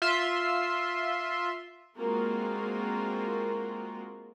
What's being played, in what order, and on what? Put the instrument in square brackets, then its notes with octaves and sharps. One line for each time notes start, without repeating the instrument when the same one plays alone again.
[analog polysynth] F4 E5 C6
[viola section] G#3 A#3 C4 F4 F#4 A#4